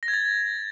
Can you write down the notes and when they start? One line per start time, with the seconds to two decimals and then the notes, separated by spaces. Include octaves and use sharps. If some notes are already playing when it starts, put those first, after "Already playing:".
0.03 A#6
0.08 G#6
0.14 A6